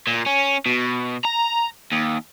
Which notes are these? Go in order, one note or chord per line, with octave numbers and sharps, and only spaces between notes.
A#2
C#4
B2
A#5
D#2